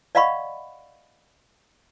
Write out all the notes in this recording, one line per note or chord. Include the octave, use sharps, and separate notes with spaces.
D5 D#5 F5 F#5 B5 C#6